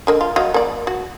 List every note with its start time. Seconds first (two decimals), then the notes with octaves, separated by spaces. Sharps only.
0.07 D3 A#4 D#5
0.21 F4
0.36 F#3 D#5 F5
0.54 A#3 D5
0.87 F#4